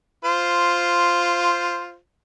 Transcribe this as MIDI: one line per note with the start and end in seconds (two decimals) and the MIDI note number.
0.25 1.96 65
0.25 1.96 72